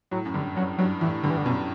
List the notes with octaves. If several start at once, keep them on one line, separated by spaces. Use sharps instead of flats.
A2 F#3
F#2
G2 D3
F#2 F#3
G2 F#3
A2 E3
G2 D3
E3
D3
F#2 B2